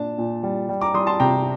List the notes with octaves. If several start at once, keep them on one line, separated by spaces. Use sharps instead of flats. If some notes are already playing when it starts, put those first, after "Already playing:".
Already playing: A#2 D4 A5
A#2
G3
G3
A#5 D6
G3 C6 D#6
A5 C6
C3 G5 A#5